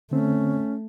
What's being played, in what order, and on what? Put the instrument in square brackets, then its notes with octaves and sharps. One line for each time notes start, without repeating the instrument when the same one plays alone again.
[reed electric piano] D3 C4 [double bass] A3 [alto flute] C#4